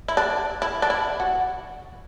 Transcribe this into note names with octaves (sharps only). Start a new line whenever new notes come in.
E4
D4
E4
D4
E4
F#4